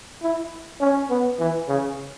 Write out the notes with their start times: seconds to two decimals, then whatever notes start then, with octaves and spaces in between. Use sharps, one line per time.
0.22 E4
0.80 C#4
1.10 B3
1.39 E3
1.68 C#3